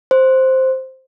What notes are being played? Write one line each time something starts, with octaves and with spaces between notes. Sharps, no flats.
C5